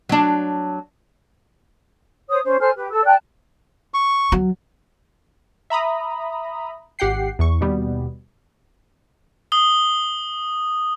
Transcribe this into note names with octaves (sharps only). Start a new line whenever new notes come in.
F#3 D4
C5 C#5 D#6
C#4 C5
A4 C5 G#5 F6
G4 B4
A4 E6
D5 G5 A5 F#6
C#6
F#3
E5 A#5 B5 D#6
G#1 G4 F#5 G5 C7
E2 C#6
D#2 B2 G3 B3
D#6 G7